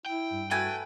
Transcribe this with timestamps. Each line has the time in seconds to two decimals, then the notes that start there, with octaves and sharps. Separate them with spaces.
0.06 E4 G5
0.30 G2
0.51 A3 F#4 B4 G5 G#5